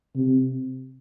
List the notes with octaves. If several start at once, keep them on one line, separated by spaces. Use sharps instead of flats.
C3